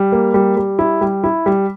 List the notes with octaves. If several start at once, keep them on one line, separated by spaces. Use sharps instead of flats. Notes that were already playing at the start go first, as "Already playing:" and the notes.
Already playing: G3
A#3
G3
G3
E4
G3
E4
G3